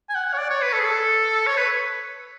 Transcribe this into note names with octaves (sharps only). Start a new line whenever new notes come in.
G#5
F#5
C#5
D5
C#5
B4
A4
G#4
A4
C#5
B4